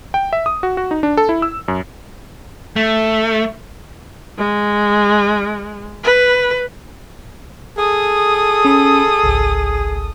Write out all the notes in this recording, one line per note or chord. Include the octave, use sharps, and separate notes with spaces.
G5
E5
D#6
F#4
F#4
D#4
D4
A4
E4
E6
F#2
A3
G#3
B4
G#4 A4 D#6
C#4 B5
G#1 C#2